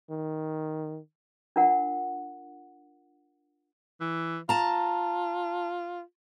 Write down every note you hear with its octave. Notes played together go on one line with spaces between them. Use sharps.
D#3
D4 F4 A#4 F#5
E3
F4 A5 A#5